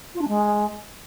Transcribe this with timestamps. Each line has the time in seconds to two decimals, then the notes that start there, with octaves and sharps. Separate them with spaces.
0.15 F4
0.21 D4
0.28 G#3